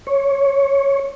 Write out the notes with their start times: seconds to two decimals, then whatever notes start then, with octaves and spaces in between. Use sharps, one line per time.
0.07 C#5